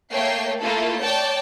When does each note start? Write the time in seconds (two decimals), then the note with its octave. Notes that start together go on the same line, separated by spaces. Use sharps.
0.12 A3 A#3 C#5 G5 C7
0.61 A3 A#3 E4 F4 A4
1.01 C#5 D5 G5 A5